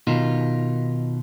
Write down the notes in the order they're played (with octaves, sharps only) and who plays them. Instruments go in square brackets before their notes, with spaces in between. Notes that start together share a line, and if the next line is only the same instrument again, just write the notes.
[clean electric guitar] B2 D#3 D#4 F4